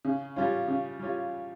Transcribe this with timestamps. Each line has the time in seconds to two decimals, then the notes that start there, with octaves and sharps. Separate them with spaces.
0.05 C#3
0.36 G3 C#4 F4
0.68 C#3
1.00 G3 C#4 F4